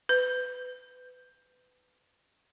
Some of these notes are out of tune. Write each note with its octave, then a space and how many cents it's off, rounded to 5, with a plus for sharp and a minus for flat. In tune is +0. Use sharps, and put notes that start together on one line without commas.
B4 +25